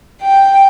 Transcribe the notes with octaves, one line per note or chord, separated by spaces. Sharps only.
G5